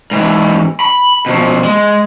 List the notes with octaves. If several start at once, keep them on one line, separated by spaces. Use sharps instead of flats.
G#2 E3
B5
B2 F3
G#3